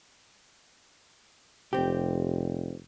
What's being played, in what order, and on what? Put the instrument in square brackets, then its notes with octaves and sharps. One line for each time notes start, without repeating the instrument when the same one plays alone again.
[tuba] F1 [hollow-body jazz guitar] C4 G4